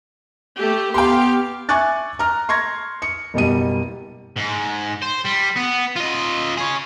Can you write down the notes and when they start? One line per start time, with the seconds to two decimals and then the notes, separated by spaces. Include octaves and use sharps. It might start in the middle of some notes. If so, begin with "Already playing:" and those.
0.57 A3 G4
0.94 B3 G4 F5 G5 C6
1.69 E5 G#5 C#6 D6 F#6 A6
2.19 A#5 F6
2.49 C6 C#6 G#6 A#6
3.02 C#7
3.34 F#1 B2 G3 D#7
4.37 G#2
5.02 C5
5.26 G3
5.57 B3
5.96 F4 D#5
6.57 G#4 C#5